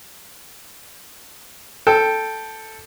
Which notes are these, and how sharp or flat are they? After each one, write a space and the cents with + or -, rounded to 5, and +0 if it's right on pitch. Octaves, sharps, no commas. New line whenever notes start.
A4 +0 G5 +5